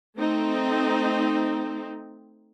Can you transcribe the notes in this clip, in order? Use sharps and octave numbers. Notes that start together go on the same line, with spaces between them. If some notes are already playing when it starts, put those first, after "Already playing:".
A3 C4 D#4